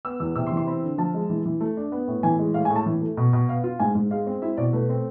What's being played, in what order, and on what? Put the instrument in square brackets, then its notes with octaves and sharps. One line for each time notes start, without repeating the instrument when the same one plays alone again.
[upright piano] B3 E6
E2 E6
C3 E6
C6
E3
C6
C4 B5
D3
F3 A5
G#3
E3
E3
A3
D4
B3
A2
E3 G#5
G#3
A2 F5
G#5
A2
A5
E3
A3
B2
B2
B3 F5
F4
G#2 G#5
G#2
G#3 F5
C4
E4 E5
B2 D5
A3 B4
C4